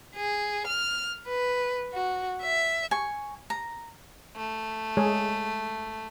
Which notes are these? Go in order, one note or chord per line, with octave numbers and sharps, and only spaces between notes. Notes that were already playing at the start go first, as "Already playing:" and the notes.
G#4
F6
B4
F#4
E5
G#5 C#6
A#5
A3
G#3 G#4 C#5